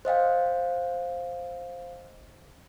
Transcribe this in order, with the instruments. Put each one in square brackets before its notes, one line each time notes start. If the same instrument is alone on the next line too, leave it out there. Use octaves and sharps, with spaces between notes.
[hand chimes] C5 D#5 F5 G5